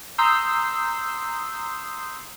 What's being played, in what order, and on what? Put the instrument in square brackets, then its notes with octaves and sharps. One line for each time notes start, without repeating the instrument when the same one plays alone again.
[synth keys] A#5 C6 D#6 E6 G6 C7